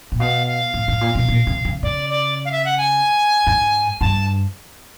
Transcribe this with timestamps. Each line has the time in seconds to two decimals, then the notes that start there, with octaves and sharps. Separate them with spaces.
0.12 A#2
0.19 B2 F5
0.47 F5
0.74 A2
0.88 A2
1.01 A#2
1.15 B2
1.28 A#2
1.47 C3
1.65 C#3
1.83 C#3 D5
2.10 D5
2.45 F5
2.52 E5
2.65 F#5
2.78 G#5
3.47 G#2
4.00 G2 A5